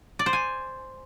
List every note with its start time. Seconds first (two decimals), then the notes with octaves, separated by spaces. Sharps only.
0.19 D5
0.26 C5
0.33 G#5